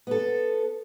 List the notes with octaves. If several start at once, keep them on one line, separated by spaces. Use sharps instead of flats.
B3 A4